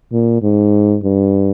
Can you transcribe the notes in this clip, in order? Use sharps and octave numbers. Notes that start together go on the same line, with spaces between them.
A#2
G#2
G2